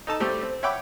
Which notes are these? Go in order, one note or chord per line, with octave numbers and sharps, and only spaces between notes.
D#4 A4 A5
G3 A3 C4 G4
C4
C#5 E5 F#5 G5 B5 D6